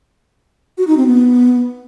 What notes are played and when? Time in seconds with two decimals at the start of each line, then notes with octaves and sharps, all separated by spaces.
0.78 F#4
0.87 D#4
0.97 C4
1.07 B3